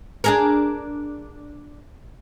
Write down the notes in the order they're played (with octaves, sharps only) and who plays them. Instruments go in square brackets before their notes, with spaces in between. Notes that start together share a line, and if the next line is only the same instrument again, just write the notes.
[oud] D4 G#4 A#4